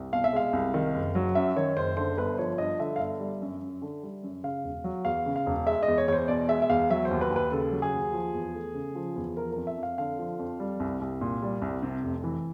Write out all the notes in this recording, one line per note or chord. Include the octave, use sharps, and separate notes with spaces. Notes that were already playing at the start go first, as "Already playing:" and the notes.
Already playing: C2
B2 F5
E5
G#3 F5
C2
D#3
F#1
F#3
F#2 E5
D#3 C#5
F#1 C5
D3 C5
G1 B4
C5
F3 C#5
G2 D#5
D3 E5
F5
G1 E5
G3
F#2
F#2
D3
G3
F#2
C#3 F5
E1
F#3
E2 F5
C#3
F5
E1
G#3 E5
D#5
E2
C#5
E2 C5 C#5
B2 D5
G#3 E5
E5
E2 F5
F#3 E5
C5
D#2
B4
D#2
B4
C#3 A4
F#3
G#4
D#2
F3
E2
A3
C#3
F3
E2
F3 A#4
F2 A#4
E5
F2
F5
D3 F5
F3
F2
G3
C2
C2
A#2
G3
C2
C3
F1
E3